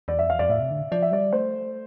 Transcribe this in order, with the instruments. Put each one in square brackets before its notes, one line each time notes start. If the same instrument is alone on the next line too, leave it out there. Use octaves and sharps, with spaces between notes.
[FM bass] E2 [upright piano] D5
[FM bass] F2 [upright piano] E5
[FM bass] E2 [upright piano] F5
[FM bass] F2 [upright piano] D5
[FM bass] A2 [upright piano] E5
[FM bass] C3
D3
[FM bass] F3 [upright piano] D5
[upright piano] E5
[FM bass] G3 [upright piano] D5
[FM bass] A3 [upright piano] C5